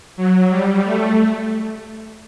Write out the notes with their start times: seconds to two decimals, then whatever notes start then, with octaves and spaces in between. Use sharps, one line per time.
0.17 F#3
0.50 G3
0.84 A3